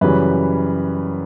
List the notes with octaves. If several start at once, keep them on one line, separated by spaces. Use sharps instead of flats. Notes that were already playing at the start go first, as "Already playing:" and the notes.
F#2 C#3 E3 G3 B4